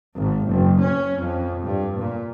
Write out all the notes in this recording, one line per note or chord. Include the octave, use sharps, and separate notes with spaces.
G#1
F#1
C#4
F2
G2
A#2